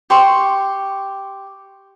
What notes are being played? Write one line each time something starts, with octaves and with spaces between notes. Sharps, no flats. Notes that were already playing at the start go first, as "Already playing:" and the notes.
G4 C6 C#6